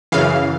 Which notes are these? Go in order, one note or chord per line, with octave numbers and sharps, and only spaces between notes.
F#2 C#3 E3 F5